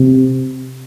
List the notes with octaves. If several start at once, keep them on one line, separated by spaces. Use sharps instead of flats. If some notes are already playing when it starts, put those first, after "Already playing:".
Already playing: C3